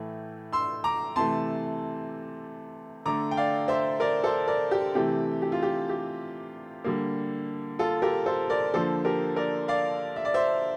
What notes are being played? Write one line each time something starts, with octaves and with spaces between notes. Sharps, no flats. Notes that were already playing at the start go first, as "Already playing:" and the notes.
Already playing: A2 E3 A3
C6 E6
A#5 D6
C3 E3 A3 A5 C6
D3 A3 A#5 D6
G5
D5 F5
C5 E5
A#4 D5
A4 C5
A#4 D5
G4
C3 E3 A3 G4
G4
F4
G4
G4
D3 G3 A#3
F4 A4
G4 A#4
A4 C5
A#4 D5
D3 F3 A#3 A4 C5
G4 A#4
A#4 D5
D5 F5
E5
D5
C5 E5